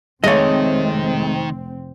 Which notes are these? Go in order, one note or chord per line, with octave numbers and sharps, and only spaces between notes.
F1 D#3 G#3 A3 C4 C#5 D#5